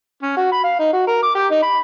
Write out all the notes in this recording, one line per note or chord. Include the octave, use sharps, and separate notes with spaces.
C#4
F#4
B5
F5
D#4
F#4
A#4
D6
G4
D#4
B5